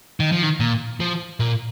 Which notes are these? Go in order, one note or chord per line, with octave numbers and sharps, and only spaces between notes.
D#3
F3
D#3
A#2
F3
A#2